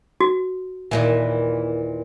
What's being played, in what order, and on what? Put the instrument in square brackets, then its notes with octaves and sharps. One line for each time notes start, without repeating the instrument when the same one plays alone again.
[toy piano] F#4
[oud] D#2 A#2 E3